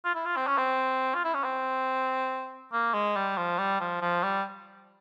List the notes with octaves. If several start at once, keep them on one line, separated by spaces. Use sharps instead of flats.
F4
E4
F4
C4
C#4
C4
F4
E4
C#4
C4
A#3
G#3
G3
F3
G3
F3
F3
G3